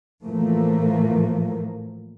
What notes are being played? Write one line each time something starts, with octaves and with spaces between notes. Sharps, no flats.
A2 E3 F3 A3 A#3